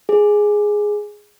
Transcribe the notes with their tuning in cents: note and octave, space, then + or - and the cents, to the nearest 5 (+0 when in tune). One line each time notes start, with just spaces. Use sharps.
G#4 +0